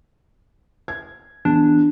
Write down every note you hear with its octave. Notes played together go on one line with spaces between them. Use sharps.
G#6
E2 D4